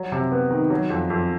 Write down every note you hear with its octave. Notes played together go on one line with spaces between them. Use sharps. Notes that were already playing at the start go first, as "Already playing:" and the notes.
Already playing: F#3
C3
B3
D#3
F#3
F2
F2